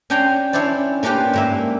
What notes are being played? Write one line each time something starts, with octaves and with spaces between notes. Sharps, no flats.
C#4 D4 G5 G#5 A#5 C6
C#4 D4 E4 C5 D5
A#3 C#4 D4 F4 G4 B4
G#2 A#3 E5